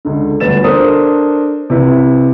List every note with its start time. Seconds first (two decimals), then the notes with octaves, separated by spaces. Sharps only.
0.05 C#2 D3
0.40 G1 D2 B4 A6 E7
0.64 D4 A4 A#4 C5 D#6
1.70 C3 E4 B4